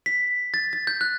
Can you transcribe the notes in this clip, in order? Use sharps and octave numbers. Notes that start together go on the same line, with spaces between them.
B6
A6
A6
G6
F#6